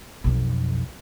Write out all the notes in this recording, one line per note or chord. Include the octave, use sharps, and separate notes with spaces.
B1 F2